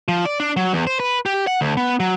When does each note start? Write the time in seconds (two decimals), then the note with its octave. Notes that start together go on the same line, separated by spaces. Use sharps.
0.08 F3
0.25 D5
0.40 D4
0.57 F#3
0.73 E2
0.87 C5
1.00 B4
1.26 G4
1.47 F#5
1.61 D2
1.77 B3
2.00 F#3